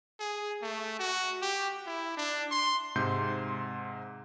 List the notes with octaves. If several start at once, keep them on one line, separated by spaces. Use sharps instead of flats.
G#4
A3
F#4
G4
E4
D4
C6
G#2 C3 C6 G6